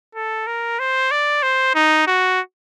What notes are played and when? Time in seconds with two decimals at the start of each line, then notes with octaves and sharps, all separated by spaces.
0.15 A4
0.47 A#4
0.79 C5
1.11 D5
1.43 C5
1.75 D#4
2.07 F#4